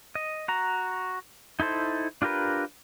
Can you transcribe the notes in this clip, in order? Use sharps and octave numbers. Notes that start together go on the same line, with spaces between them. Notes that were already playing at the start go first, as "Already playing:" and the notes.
D#5
F#4 A#5
D#4 E4 A4 C5
D4 F4 G4 A#4 B4